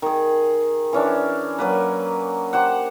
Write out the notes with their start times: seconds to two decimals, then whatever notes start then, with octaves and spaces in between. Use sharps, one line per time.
0.02 D#3 G#4
0.93 E3 C#4 D4
1.59 F#3 A#3 B4
2.53 G4 C5 F#5